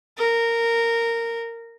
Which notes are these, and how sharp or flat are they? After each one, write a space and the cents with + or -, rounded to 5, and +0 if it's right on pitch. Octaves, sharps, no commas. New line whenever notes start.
A#4 -15